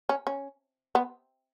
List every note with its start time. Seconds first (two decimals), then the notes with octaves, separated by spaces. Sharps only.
0.09 C#4
0.27 C#4
0.95 B3